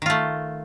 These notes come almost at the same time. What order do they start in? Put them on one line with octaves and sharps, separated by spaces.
D#3 F4 A3